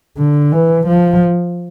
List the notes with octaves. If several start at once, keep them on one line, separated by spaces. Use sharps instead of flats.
D3
E3
F3